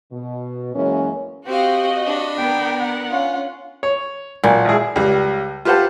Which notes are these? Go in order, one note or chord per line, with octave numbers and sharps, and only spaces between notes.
B2
F#2 E3 G#3 A#3 C#4
C4 F#4 G4 D#5 F5
D4 B5
B3 A#4 B4 G5
F#5
C#4 F4
C#5
B1 A#2
G#1 E4 G#4
C#2 G3
F4 G4 B4 C5 F#5 A5